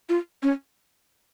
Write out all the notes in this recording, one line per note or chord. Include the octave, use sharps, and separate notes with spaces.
F4
C#4